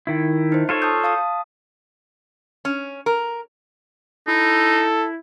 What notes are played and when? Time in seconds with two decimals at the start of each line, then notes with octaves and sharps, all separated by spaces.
0.07 D#3 E4
0.52 D#4 C5
0.69 F4 A4 C#5 A6
0.82 A5 D#6 G6
1.04 F5 A5 D#6
2.65 C#4
3.06 A#4
4.28 D#4 E4 A4